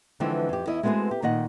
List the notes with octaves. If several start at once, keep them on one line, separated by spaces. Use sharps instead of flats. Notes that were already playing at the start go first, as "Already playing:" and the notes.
D3 E3 F3 G#3 C4
F2 G4
E2 E4 C#5 D#5
G#3 A3 B3 C4 F#4 G#4
G4
A#2 D#3 D#5 F#5